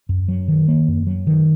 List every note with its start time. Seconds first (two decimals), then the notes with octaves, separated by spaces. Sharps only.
0.09 F#2
0.28 F#3
0.48 D#3
0.68 A#3
0.88 F#2
1.07 F#3
1.27 D#3